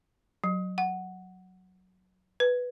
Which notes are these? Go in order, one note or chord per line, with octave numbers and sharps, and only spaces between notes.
F#3
F#5
B4